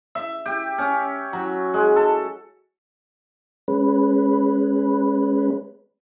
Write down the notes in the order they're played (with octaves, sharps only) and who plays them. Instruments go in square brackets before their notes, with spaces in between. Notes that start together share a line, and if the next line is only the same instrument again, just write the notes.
[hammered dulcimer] E5
G4
C#4
F#3
G#3
A4
[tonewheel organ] G#3 C#4 B4